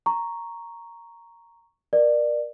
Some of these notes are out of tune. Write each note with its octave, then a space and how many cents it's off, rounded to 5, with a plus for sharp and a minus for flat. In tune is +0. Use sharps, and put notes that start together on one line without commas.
A#5 +0 C#6 +0
A#4 +30 D5 +20